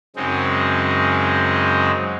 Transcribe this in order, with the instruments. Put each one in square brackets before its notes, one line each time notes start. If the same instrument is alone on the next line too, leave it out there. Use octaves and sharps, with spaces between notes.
[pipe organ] F#2 C#3 G#3 C4 D#4